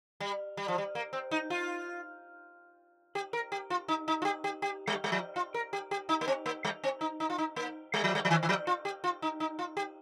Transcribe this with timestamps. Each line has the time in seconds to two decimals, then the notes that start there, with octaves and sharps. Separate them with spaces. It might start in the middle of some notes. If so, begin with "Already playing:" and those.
0.20 G3
0.57 G3
0.68 F3
0.78 G3
0.95 A#3
1.13 C4
1.31 D#4
1.50 F4
3.15 G4
3.33 A#4
3.52 G4
3.70 F4
3.88 D#4
4.08 D#4
4.22 F4
4.25 G4
4.44 G4
4.62 G4
4.87 G3
5.04 G3
5.12 F3
5.36 F4
5.54 A#4
5.73 G4
5.91 G4
6.09 D#4
6.21 A#3
6.28 C4
6.46 A#3
6.65 G3
6.84 C4
7.01 D#4
7.20 D#4
7.30 F4
7.38 D#4
7.56 A#3
7.94 G3
8.04 F3
8.15 G3
8.25 F3
8.30 D#3
8.43 D#3
8.49 F3
8.67 F4
8.85 G4
9.04 F4
9.22 D#4
9.40 D#4
9.59 F4
9.77 G4